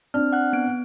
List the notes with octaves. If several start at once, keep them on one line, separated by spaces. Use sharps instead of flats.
C4 D4 F6
F#5 F#6
B3 D7